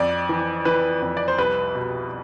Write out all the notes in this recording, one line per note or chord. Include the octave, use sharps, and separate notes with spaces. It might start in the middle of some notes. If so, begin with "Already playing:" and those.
Already playing: F2 D5
E3
E3 B4
F2
D5
C5
C2 B4
B2